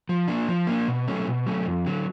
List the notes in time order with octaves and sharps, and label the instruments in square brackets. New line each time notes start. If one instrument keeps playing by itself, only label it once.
[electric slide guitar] F3
A#3 D4
F3
A#3 D4
B2
F#3 A3 C#4
B2
F#3 A3 C#4
F2
D3 F#3